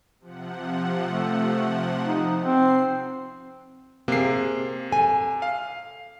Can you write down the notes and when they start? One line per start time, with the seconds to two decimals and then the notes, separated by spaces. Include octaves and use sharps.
0.20 C3 F3 F#5
1.08 A3
2.04 D#4
2.44 C4 C7
4.08 C3 A#3 G#4 C7
4.91 A4 G#5
5.42 F5